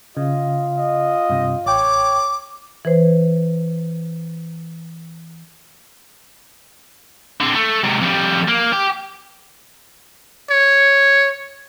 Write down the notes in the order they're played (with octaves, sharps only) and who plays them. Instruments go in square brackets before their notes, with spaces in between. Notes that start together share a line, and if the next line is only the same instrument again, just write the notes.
[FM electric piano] C#3 [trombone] F4 [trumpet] D#5
[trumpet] D#5
[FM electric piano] G2 C3
[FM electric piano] A1 G5 [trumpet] C#5 [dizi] D6
[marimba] E3 B4 C5
[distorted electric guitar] D3 C4
A3
G#2 C3
F2 G3
A#3
G4
[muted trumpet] C#5